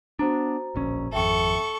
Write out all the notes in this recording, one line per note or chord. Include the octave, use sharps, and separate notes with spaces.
B3 D4 F#4 C5 A#5
D1 A#1 C#4
G#1 F2 A4 E5 G5 C#6